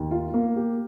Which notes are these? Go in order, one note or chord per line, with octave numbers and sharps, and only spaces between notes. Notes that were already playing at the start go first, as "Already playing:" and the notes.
Already playing: D#2
F4
A#3
G4